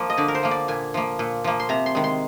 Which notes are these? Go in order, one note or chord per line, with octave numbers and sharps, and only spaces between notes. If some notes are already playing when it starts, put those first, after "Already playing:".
Already playing: F3 A#3
D#5
D3 D5
A#4
C5
F3 A#3
D5
A#2 G#5
F3 A#3
A#2
F3 A#3
C6
C3 A#5
C6
D#3 G#3
C6